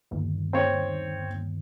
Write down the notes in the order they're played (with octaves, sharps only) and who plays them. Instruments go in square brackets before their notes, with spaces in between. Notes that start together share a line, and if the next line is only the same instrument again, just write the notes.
[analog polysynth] G1 D#2
[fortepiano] C4 C#5